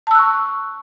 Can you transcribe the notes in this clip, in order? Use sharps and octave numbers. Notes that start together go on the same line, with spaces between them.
A5 C#6 E6 F#6